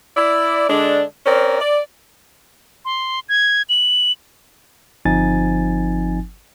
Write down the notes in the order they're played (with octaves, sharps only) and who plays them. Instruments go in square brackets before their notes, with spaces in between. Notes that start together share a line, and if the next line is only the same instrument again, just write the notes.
[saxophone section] E4 D5
D3 G#3 D4
C4 C#4 A#4 C5 D5
D5
[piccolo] C6
G#6
F#7
[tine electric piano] G1 F3 C4 D#4 G#5 A6